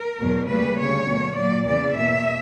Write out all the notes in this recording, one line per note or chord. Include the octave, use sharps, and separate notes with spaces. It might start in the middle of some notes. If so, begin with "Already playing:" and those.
Already playing: A#4
E2 B2 F#3
D2 C#3 G3 A#3 B4
D2 C#3 G3 C#5
B2 F#3 A#3
A#2 F#3 A#3 D5
E2 C#3 E3 D5
E2 B2 A#3 E5